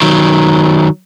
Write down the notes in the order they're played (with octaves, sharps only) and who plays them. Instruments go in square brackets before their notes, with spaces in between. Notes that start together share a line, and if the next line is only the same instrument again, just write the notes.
[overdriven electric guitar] D#3 F#3